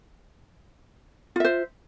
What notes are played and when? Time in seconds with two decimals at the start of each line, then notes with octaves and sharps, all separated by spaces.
1.36 F4
1.40 E5
1.45 C5